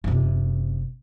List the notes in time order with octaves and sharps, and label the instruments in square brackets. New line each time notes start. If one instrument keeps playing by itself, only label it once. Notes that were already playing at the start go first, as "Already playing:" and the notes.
[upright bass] F#1 C3